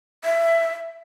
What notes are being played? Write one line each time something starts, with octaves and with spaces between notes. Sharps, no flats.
E5